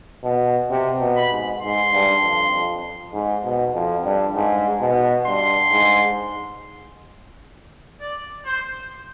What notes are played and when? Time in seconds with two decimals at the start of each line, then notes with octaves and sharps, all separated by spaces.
0.24 B2
0.70 C3
1.01 B2
1.16 B5
1.32 G#2
1.61 G#2 C6
1.93 G2
2.22 F2
2.52 F2
3.13 G#2
3.44 B2
3.74 F2
4.04 G2
4.35 G#2
4.81 B2
5.27 G2 C6
5.72 G#2
8.00 D5
8.46 C5